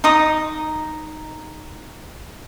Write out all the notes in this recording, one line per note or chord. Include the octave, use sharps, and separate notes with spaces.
D#4 D#6